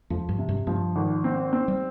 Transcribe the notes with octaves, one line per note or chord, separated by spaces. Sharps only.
F2 F3
G2
C3
G2
G2 F3
G#1
C4
C4
G3